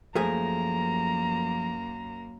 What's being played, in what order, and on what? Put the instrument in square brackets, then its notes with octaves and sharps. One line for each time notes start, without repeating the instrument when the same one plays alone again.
[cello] F#2 A#3 [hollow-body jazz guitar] F3 A3 G#4 [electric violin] A#5